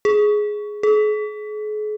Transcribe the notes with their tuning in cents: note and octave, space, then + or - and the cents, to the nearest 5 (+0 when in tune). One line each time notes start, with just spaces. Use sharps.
G#4 +10
G#4 +40